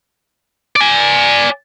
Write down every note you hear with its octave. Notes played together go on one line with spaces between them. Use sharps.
D5 G#5